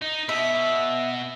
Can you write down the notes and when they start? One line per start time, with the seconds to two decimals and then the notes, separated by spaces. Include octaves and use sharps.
0.02 D#4
0.29 B2 E5